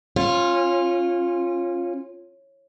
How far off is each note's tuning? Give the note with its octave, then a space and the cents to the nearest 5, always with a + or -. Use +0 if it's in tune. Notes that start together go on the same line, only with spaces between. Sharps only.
C#4 -25 F4 +0